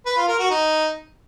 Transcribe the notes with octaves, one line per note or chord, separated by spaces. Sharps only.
B4
F4
A#4
F#4
D#4